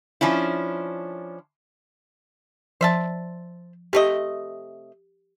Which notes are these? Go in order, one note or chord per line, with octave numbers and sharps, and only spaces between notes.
F3 C#4 D4 E4
F3 C5 D5 E5 A5
C3 A3 G4 D#5